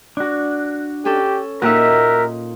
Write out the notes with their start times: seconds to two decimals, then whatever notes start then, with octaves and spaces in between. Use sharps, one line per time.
0.17 D4 F#4
1.05 C#4 G4 A4
1.62 A#2 D#4 F#4 G4 A#4 E5